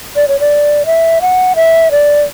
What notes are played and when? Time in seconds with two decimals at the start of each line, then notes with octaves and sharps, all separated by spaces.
0.16 D5
0.28 C#5
0.40 D5
0.86 E5
1.21 F#5
1.56 E5
1.91 D5